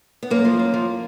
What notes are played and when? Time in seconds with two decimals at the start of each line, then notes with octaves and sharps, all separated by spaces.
0.23 B3
0.30 F#2 A#3
0.45 F3
0.59 F#2
0.74 F3